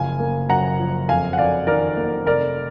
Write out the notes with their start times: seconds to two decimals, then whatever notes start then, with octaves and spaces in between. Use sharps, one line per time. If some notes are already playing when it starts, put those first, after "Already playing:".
Already playing: F#1 F3 F5 G#5
0.19 A#3
0.49 F#2 F#5 A#5
0.79 F3
1.08 F2 F5 G#5
1.33 F#5
1.38 F2 D5 F5
1.67 D#3 A#4 D5
1.97 A#3
2.26 F1 A#4 D5